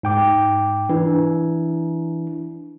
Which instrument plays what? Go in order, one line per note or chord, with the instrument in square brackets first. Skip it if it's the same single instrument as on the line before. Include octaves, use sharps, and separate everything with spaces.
[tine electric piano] G#2 G5 D6
[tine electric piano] E3 [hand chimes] D4 E4